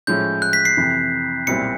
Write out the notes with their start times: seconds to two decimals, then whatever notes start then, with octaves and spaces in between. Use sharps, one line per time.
0.07 A2 F3 G#3 C#4 G6
0.42 F#6
0.53 B6
0.65 C7
0.77 F2 C3 E3
1.47 B1 A#2 G3 C4 E4 C#7